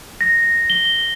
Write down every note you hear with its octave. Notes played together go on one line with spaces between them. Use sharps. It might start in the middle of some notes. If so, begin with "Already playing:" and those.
A#6
G7